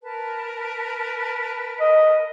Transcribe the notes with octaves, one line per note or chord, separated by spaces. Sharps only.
A#4 B4 A5
D#5